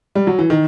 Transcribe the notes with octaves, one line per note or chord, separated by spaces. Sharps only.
G3
F#3
E3
D#3